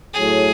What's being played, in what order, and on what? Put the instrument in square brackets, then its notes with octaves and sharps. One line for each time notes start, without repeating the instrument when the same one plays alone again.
[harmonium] A2 F#3 A3 [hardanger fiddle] G#4